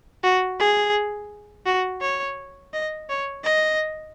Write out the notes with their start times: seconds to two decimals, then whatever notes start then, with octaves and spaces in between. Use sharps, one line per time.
0.24 F#4
0.60 G#4
1.66 F#4
2.01 C#5
2.73 D#5
3.10 C#5
3.44 D#5